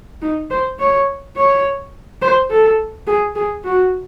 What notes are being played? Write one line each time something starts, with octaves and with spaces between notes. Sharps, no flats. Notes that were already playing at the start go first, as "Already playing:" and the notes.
D#4
C5
C#5
C#5
C5
A4
G#4
G#4
F#4